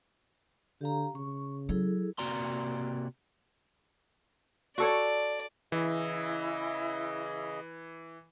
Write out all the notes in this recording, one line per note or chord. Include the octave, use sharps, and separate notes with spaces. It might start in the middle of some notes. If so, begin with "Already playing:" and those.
D3 G4 F5 A#5
C#3 C#6
F#3 E4 G#4 A4
C3 A#3 F#4 D5 A#5 C6
F#4 A4 C#5 D5
C#3 E3 E4 G#4 D#5